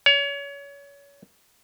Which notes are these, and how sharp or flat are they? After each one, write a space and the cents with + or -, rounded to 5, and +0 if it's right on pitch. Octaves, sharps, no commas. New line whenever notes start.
C#5 +30